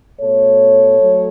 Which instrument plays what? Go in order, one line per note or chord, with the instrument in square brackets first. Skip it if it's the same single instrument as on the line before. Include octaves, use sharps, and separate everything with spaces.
[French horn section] B2 A3 A4 C#5
F#3 A3